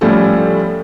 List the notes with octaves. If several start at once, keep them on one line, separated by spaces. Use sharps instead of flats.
A2 F3 G3 A3 C#4 A4